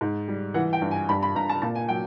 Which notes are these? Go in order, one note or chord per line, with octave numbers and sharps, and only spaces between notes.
G#2
G3
E3 F#5
G5
G2
G#5
G2 B5
B5
G2 A#5
A5
A#2 A5
G#5
F#3 G5